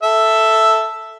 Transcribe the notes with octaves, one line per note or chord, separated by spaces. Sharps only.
A4 E5